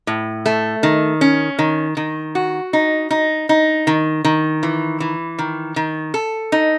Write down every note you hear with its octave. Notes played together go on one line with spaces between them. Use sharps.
A2
A3
D#3
C#4
D#3
D#3
F#4
D#4
D#4
D#4
D#3
D#3
E3
E3
D#3
D#3
A4
D#4